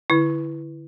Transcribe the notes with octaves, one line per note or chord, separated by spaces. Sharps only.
D3 E4